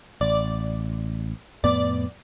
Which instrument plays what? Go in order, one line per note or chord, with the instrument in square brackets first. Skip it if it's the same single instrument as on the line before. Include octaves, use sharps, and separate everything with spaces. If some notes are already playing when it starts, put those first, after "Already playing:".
[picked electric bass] A1 [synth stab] D5
[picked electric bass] F2 A2 B3 [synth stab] D5